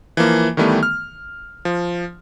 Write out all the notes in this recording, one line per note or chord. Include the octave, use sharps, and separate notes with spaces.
E3 F3 A#3
D#3 E3 G3 A3 B3
F6
F3